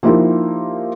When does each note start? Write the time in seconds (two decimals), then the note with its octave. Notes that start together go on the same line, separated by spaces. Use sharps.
0.03 F3 A#3 D#4 E4 G4 A#4